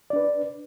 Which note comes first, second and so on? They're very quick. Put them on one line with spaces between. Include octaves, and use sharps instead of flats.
D5 D4 B4